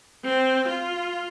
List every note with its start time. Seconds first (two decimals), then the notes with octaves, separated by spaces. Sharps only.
0.24 C4
0.67 F4